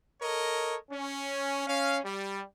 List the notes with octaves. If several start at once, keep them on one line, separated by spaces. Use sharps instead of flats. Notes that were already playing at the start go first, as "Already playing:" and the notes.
A4 A#4 C#5 D#5
C#4
C#4 F5
G3